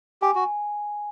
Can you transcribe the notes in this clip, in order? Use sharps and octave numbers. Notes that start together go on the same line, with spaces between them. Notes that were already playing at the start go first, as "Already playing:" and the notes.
G4 G#5
F#4